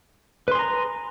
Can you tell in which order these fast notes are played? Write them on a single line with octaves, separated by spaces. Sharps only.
B4 C6 G#4 A#5